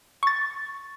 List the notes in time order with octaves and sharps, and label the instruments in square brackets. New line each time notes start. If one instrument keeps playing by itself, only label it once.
[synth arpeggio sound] C#6 A6